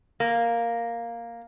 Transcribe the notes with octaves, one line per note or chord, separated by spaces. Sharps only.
A#3